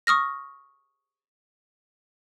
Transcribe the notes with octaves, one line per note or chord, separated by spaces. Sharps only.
C#6 D#6 F6 A#6